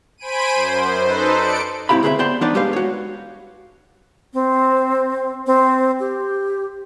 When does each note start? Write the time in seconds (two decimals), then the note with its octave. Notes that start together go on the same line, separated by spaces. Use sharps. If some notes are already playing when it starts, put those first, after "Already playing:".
0.17 C5 G#5 B5 D7 D#7
0.55 F#2 C5
1.00 D#4 A4 B4 C5
1.34 D5 C#7 D7
1.89 G#2 C4 E4 G4 F5 B5
2.03 D2 C4 G#4 B4 C#5 E5
2.19 B3 C5 D5 G5 A5 C6
2.41 E2 B3 D4 D#4 D5
2.55 G3 G#3 G4 B4 F5
2.73 F#4 C#5
4.34 C4
5.47 C4
6.00 G4